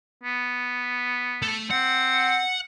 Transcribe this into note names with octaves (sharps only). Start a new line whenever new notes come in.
B3
A3
C4 F#5